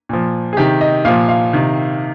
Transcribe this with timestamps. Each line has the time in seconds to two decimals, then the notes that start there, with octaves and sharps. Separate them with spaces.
0.09 A#2 F3
0.53 G#4
0.57 C3 D#3 G4
0.81 D#5
1.05 A#2 F3 F5
1.29 F5
1.53 C3 D#3